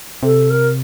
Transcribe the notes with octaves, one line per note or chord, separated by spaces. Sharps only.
C3 A4
A#4